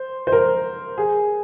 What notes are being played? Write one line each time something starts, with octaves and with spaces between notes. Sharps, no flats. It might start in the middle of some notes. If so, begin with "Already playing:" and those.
Already playing: C5
C5
A#4
G#4